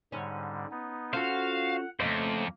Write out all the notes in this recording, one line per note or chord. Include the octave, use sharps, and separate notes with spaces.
G#2 D3 G3 C#4
B3 D#4
C#4 F4 F#4 A4 C5 F5 F#5
F2 C#3 A3 A#3 C#4 C5 D#5